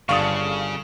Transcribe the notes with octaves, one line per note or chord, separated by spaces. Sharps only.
G1 C#3 D4 F5 A5 C#6 D#6